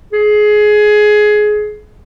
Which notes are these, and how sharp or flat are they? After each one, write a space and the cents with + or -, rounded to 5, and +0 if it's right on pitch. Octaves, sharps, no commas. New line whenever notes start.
G#4 +20